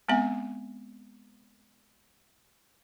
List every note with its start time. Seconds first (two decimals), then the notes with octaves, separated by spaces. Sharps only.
0.08 G#3 B3 C4 E5 G#5